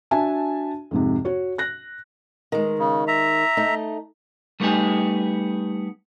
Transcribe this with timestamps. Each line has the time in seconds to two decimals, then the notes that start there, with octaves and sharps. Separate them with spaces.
0.11 D4 F#4 E5 G#5 A5
0.91 F2 G#2 C3
1.25 F#4 C#5
1.58 F#6 A#6
2.52 D#3 G#3
2.79 C#3
3.08 E5 A#5
3.57 A3 D#4
4.60 G3 A3 B3 D#4 G4 G#4